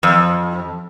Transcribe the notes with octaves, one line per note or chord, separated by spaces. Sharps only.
F2